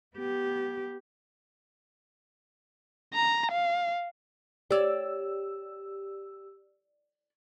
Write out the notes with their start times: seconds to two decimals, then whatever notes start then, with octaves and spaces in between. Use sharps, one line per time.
0.15 B3 G4
3.14 A#5
3.52 F5
4.71 G4 C#5 D5 E6